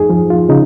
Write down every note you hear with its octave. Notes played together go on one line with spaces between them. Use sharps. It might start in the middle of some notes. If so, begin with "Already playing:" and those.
Already playing: F2 D#4 G#4
F3
F4
C#3 D#4